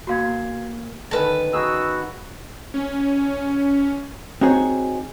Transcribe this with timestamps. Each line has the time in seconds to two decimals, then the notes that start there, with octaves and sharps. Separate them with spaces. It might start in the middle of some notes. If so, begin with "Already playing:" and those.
0.07 A#2 F#4 F5 C6 G#6
1.11 D3 D#3 C#4 B4 A5
1.53 B3 D#4 F#4 G#4 E6
2.74 C#4
4.41 C4 D#4 F#4 G#4 C5 C#5